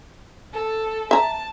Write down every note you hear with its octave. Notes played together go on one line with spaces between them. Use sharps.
A4
E5 A5 A#5